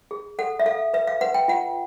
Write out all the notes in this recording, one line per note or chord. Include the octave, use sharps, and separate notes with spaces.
G#4
A4 F#5
E5
A4 F5
B4 E5
F5
B4 F#5
G5
F4 F#5